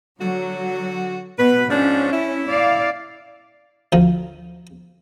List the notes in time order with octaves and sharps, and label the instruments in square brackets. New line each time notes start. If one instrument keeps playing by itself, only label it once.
[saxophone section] D3 F#4 [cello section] F#3
[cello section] B2 [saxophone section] B4
[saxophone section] G#2 F3 D4 [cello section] C#4
[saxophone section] E4
[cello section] D5 F5
[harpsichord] D2 F3 D#4